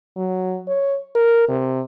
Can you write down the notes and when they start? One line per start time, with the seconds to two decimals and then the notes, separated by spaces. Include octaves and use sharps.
0.17 F#3
0.68 C#5
1.15 A#4
1.48 C3